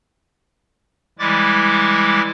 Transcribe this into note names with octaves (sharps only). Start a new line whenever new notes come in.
E3 G3 G#3 E4 D6 A6